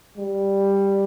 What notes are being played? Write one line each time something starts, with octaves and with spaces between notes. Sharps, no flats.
G3